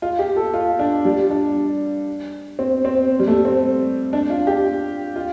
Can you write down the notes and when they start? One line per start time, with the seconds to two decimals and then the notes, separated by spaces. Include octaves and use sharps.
0.02 F4
0.19 G4
0.36 A4
0.54 F4
0.79 D4
1.05 G3
1.30 D4
2.59 C4
2.85 C4
3.20 G3
3.27 A3
3.45 C4
4.13 D4
4.30 F4
4.47 G4
5.16 F4